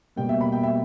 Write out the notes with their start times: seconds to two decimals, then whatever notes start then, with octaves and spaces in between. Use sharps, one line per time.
0.16 B2 G3 A#3 G5
0.29 E5
0.41 B5
0.52 G5
0.63 E5